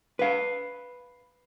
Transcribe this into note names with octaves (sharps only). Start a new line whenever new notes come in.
B4 F5